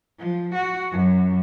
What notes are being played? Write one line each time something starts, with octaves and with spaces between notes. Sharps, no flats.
F3
F#4
F#2